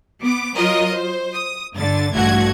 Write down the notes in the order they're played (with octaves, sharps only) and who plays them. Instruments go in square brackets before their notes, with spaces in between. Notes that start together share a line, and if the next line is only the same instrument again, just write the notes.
[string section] B3 D6
F#3 F4 A#4 D#5 D#6
C5
D#6
G2 D3 A6
A1 G2 A3 F#4 F#5 G#6